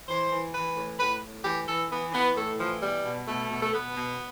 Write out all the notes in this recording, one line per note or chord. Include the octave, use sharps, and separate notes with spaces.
E3 C5
E3
E3 B4
A2
A2 B4
A2
E3 G4
E3 A4
E3 B3
E3 B3
A2 A3
E3 F3
B2 G3
B2
B2 A3
B2
A3
B2 B3
B2